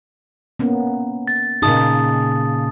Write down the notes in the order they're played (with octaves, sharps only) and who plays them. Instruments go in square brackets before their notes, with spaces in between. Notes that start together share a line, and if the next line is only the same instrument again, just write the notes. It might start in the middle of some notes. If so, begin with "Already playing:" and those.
[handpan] A#3 B3 C#4
[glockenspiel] A6
[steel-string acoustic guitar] A#2 C#3 G#4 [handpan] D#4 [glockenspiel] A5 D#6 A6